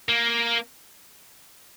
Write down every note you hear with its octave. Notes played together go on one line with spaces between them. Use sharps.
A#3